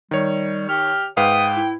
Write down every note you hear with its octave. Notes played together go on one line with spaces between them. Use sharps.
D#3 G3 C#5
G4 F6
G#2 B4 F5 G5 D#6
E4